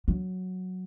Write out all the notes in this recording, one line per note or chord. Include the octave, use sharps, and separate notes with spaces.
F#3